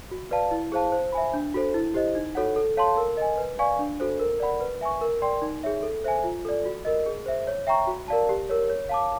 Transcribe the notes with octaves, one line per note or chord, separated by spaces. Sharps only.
F#4
B4 D5 F5 A5
E4
G#4 C5 F5 A5
C5
E5 G#5 B5
D4
F#4 A4 C5
E4
G4 C5 D#5
D#4
F#4 A4 C#5 F#5
A4
C#5 F5 A5 C6
A#4
D#5 G#5
B4
D5 F5 G#5 C#6
D4
F#4 A4 C5
A#4
D5 F#5 B5
B4
E5 G#5 C#6
A#4
D5 G5 C6
D#4
G#4 C#5 E5
A4
C5 E5 G#5
F4
A4 D5
F#4
A#4 D#5
G#4
C5 E5
C#5
E5 G5 A#5 C#6
F#4
A#4 D5 F5 A5
G4
A#4 C#5
C#5
F5 A5 D6